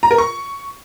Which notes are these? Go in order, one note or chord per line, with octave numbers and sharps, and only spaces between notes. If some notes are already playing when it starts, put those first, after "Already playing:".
A#5
A#4
C#6